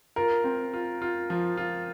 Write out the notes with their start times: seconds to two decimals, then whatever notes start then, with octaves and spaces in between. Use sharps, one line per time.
0.16 F4 A#4
0.44 C4
0.74 F4
1.02 F4
1.30 F3
1.57 F4